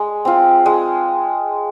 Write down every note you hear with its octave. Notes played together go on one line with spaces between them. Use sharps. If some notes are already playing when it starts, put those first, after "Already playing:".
Already playing: G#3
C4 F4
G#3